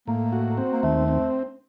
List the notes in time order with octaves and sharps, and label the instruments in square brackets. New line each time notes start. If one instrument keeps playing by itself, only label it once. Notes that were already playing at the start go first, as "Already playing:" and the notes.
[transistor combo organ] A2 [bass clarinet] A#3
[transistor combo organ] F#4
C4
[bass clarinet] A#3
[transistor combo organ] D#2 [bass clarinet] A3
[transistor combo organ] C4